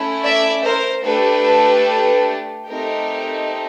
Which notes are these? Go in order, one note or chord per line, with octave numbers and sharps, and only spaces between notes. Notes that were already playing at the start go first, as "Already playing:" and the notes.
Already playing: A3 C#4 E4
D5 E5
A#4 C5
A3 D4 G4 A4 B4
A3 C4 D#4 G4 A#4